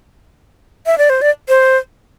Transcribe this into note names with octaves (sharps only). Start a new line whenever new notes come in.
E5
D5
C5
D5
C5